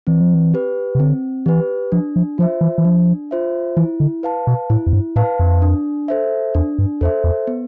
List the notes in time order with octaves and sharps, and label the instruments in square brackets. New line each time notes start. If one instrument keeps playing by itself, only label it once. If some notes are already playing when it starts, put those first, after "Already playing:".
[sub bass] E3 [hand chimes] C4
[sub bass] F3
E3
[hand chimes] G4 B4
[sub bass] C3
[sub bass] D3 [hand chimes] C4
[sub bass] E3 [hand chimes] G4 B4
[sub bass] F3 [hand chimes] D4
[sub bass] F3
[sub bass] F3 [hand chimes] F4 C5 E5
[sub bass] E3
E3
[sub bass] F3 [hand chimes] D4
[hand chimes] F4 C5 E5
[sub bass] E3 [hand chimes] E4
[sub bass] D3
[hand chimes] B4 F5 A5
[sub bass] B2
[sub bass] A2 [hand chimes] E4
[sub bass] F2
G2
[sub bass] A2 [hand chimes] B4 F5 A5
[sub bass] F2
[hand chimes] D4
A4 C5 E5
[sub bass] E2 [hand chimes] D4
[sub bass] G2
[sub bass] E2 [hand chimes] A4 C5 E5
[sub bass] E2
[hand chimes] B3